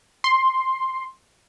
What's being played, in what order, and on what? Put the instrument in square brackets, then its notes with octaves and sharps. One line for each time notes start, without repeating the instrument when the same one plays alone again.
[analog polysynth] C6